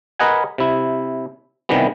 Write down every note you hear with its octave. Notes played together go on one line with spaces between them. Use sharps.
A#4 B4 D#5 F#5 G#5
C3 E4
C3 D#3 E3 G3 B3